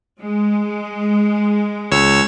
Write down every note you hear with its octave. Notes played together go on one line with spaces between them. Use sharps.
G#3
C#2 C#5 E6